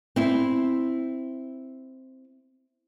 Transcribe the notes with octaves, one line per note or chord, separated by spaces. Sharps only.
C4 E4